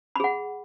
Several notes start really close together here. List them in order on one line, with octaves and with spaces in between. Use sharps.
B5 G#4 F#5